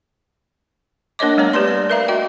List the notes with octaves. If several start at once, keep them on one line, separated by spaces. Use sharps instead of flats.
A#3 D4 A#4 C#5 D#5 D6
G3 A3 B3 C#5 A#5
G4 B4 D5 C6
D5
A#4 B4 E5 F5 A#5
F#4 D#5 G5